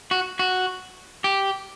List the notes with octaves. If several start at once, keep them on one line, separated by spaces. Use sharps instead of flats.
F#4
F#4
G4